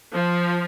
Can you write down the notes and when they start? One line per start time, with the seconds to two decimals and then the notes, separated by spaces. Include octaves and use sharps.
0.14 F3